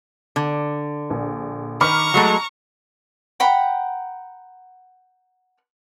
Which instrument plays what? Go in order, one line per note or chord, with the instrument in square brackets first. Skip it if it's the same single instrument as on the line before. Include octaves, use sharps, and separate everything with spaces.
[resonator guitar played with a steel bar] D3
[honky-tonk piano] A#1
[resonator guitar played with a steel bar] D#3 [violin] A#5 C#6 [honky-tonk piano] B5 D6 F6
[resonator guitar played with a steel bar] F#3 G#3 A3
[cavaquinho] F#5 G5 A#5 B5